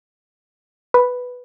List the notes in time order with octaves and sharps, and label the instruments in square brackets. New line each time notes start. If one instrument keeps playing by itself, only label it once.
[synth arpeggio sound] B4